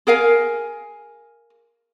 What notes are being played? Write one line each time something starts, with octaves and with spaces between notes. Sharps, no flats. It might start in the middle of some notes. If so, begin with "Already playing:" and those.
G#4 A#4 F5 G#5